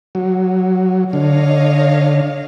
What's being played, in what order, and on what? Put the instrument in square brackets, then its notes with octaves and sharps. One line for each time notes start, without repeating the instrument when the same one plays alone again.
[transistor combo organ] F#3
[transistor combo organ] D3 [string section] C#5 D#5 F5